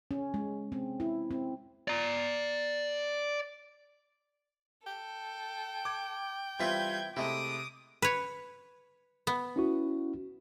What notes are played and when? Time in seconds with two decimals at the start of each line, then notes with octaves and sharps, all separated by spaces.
0.11 C#4
0.34 G#3
0.72 C4
1.00 E4
1.31 C4
1.88 D5 A#5
4.87 A4 G5
5.85 D6 G#6
6.60 E3 G3 C4 F4 B4 G6 G#6 B6
7.17 C3 G#3 A3 E4 D6 D#6
8.02 B4 C#5
9.27 B3
9.56 C#4 E4 F#4